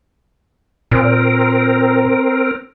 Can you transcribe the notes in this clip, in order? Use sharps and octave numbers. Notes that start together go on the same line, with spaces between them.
A#2 C4 A#4